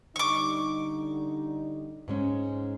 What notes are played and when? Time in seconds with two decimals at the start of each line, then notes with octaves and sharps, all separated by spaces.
0.16 D3 G3 D#4 C#6 D6
2.08 G#2 G#3 C#4